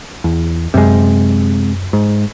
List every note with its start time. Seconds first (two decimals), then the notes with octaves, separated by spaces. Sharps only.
0.24 E2
0.74 F#2 C3 G#3
1.93 G#2